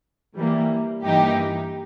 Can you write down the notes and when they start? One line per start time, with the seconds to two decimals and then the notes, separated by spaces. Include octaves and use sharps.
0.36 E3 G3 A#3
1.05 G2 E3 A#3 D#4 G4